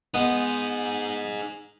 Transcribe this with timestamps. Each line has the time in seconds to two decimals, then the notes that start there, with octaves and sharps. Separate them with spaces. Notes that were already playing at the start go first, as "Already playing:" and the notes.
0.14 B3 D#4 G#4 D#5 F#5